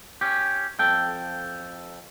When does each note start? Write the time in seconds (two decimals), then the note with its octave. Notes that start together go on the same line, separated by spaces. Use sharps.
0.21 C#4 G4
0.79 F2 A4 G5